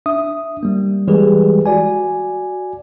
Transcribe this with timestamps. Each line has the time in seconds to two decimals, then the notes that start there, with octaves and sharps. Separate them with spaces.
0.06 D4 E5 D#6
0.63 G3 A#3
1.08 E3 G3 G#3 G4 G#4 B4
1.66 F#4 D5 G#5